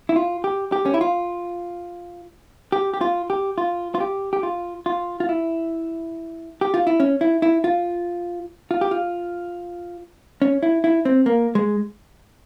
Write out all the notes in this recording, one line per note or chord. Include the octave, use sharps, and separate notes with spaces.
E4
F4
G4
G4
C#4
E4
F4
G4
G4
F4
G4
F4
F4
G4
G4
F4
F4
F4
E4
G4
F4
E4
C#4
E4
E4
F4
F4
G4
F4
C#4
E4
E4
C4
A#3
G#3